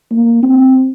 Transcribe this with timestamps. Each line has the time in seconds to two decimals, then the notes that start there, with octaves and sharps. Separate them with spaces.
0.12 A#3
0.43 C4